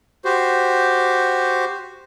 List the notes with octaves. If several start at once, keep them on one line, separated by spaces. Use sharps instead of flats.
F#4 G4 C5